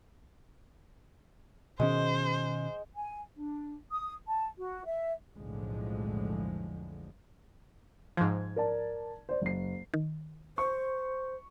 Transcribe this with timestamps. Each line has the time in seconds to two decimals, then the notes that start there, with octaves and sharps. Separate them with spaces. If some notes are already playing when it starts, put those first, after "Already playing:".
1.80 B2 D#3 G#3 C#4 C5
2.95 G#5
3.36 D4
3.91 D#6
4.27 A5
4.58 F#4
4.85 E5
5.36 B1 F2 A2 D3 F3 G#3
8.17 G#2 F3 G#6
8.56 A#4 D5 A5
9.29 C5 D5
9.42 F#1 C7
9.94 D#3
10.58 C5 C#6